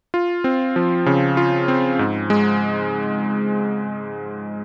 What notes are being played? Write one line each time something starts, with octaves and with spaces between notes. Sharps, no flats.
F4
C4
F3
C#3
F4
C4
G#2
G#3